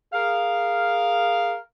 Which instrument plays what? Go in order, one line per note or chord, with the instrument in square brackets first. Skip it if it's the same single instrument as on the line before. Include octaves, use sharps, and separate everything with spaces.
[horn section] G#4 A#4 F5